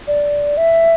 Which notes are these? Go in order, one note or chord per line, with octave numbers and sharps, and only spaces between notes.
D5
E5